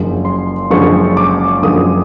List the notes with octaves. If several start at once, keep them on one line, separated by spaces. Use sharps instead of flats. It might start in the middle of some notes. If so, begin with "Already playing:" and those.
Already playing: F#1 F#2 D3 F3 G#3
C6
F#1 F#2 D3 F3 G#3 C#6
D6
F#1 F#2 D3 F3 G#3 D#6